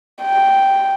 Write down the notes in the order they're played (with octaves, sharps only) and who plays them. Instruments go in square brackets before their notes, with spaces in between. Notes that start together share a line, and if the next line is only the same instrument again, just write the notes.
[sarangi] G5